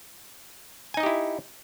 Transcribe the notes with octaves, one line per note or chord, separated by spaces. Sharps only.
D#4 E4 G4 D#5 G#5